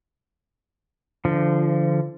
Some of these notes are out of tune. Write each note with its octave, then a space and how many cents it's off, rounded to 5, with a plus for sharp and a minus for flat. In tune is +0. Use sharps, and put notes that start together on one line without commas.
D3 +0 F3 -25